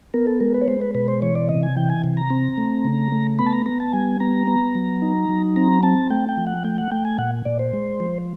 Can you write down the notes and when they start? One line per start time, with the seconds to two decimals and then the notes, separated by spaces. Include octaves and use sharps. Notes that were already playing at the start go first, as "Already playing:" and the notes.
0.14 B3 A#4
0.27 A4
0.40 G#3 A#4
0.54 B4
0.61 C#5
0.68 G#3 C5
0.81 B4
0.95 B2 B4
1.08 C5
1.22 E3 C#5
1.35 D5
1.49 C3 D#5
1.63 G#5
1.77 E3 G5
1.90 G#5
2.04 C3
2.17 A#5
2.30 C4
2.58 A3
2.85 C#3
3.12 A3
3.39 B3 B5
3.46 A5
3.53 A#5
3.66 B3 A#5
3.80 A5
3.93 G3 G#5
4.20 B3 A#5
4.47 B3
4.75 F#3
5.02 D#4
5.29 F#3
5.56 C4 A#5
5.83 C4 A5
6.10 A3 G5
6.29 G5
6.37 F3
6.47 F#5
6.64 A3 G5
6.78 F#5
6.92 A3 G5
7.05 G#5
7.18 A#2 F#5
7.45 A#2 D5
7.59 C5
7.73 G#3
8.00 F3